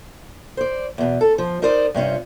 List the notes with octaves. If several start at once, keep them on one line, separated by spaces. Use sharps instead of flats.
C5 D5
E2 B2
A4
F3
D#4 A#4 C5 D5 D#5
G2 C3 C#4 F4